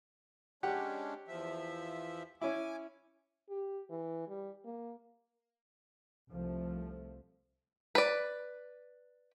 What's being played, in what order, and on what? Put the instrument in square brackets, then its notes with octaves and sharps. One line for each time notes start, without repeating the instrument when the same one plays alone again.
[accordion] G#3 C#4 D4 [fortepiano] G4 F#5
[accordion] E2 F3 E5
[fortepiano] C#4 E4 [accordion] G#5 D6
[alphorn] G4
E3
G3
A#3
[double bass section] C2 F3 A3
[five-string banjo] B4 D5